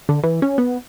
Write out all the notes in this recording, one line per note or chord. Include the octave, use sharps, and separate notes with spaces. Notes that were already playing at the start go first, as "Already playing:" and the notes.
D3
E3
C#4
B3